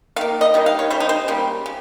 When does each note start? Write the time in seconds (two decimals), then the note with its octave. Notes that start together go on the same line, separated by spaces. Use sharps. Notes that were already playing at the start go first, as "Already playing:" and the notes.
0.16 D#3 A#3 F5
0.41 D#5
0.54 D#3 G3 A#3
0.66 F5
0.79 C#5
0.90 C#3 G3 C5
1.00 D#4
1.09 C5
1.28 C#3 G3 A#3
1.66 C#3